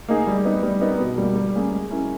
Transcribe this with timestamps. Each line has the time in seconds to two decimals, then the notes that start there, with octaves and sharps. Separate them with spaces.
0.09 A#3 D#4 G#4
0.27 G3
0.45 B3 D#4
0.63 G3
0.81 B3 D#4 A#4
0.99 B2
1.18 G3 A#3
1.36 G3
1.55 A#3 C#4 G#4
1.73 G#3
1.91 C#4 E4 A#4